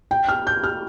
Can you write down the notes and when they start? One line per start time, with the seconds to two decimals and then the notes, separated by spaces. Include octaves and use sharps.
0.11 G5
0.29 F6
0.47 G6
0.64 F6